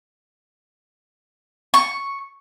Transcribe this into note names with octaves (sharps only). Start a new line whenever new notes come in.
C#6